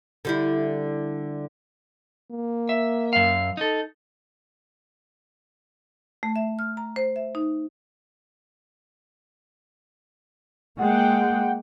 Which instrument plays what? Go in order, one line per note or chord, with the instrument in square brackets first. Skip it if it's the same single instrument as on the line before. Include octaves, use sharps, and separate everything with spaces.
[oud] D3 G3 E4
[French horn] A#3
[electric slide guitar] E5
F#2 F5
D#4 A4
[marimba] A3
E5
F6
A#5
C5
E5
D#4
[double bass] G#3 A#3 [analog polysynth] F#5 G5